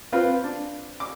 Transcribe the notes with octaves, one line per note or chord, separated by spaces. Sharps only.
C4 F4 B4
D4
D6